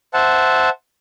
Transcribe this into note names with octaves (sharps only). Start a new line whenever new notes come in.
C5 E5 F#5 A5